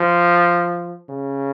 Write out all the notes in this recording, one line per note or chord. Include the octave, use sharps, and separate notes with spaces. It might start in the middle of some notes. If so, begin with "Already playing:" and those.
Already playing: F3
C#3